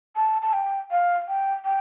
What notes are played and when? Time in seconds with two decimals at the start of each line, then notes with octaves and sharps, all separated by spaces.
0.16 A5
0.42 A5
0.53 G5
0.91 F5
1.28 G5
1.65 G5